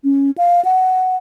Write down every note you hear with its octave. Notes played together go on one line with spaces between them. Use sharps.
C#4
F5
F#5